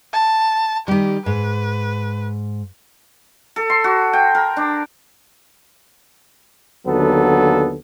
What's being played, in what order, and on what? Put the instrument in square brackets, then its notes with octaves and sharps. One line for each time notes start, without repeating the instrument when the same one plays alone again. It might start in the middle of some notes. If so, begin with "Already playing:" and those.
[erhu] A5
[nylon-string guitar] D#3 G3 [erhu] G4
[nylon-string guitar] G#2 [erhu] B4
[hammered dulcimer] A4
C6
F#4
G5
A#4
D4
[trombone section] D#2 D3 F#3 B3 A4